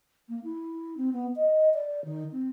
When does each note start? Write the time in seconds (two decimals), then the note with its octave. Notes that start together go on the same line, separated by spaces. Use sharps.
0.29 A#3
0.44 E4
0.97 C4
1.13 B3
1.36 D#5
1.74 D5
2.05 D#3
2.32 C4